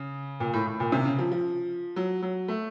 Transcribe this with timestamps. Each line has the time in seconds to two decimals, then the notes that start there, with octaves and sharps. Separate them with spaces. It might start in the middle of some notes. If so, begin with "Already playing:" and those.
Already playing: C#3
0.40 A#2
0.54 A2
0.67 A2
0.80 A#2
0.92 C3
1.05 C#3
1.19 F3
1.32 F3
1.96 F#3
2.22 F#3
2.48 A3